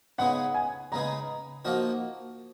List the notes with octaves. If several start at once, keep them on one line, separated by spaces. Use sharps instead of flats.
C#3 G#3 B3 D#4 G#4 F#5
G#5
C#3 G#3 B3 D#4 G#4 A#5
F3 A#3 D#4 F#4 A#4